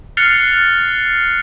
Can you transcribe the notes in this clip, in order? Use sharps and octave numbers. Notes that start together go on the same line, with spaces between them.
F6 F#6 A6 C7 C#7 F7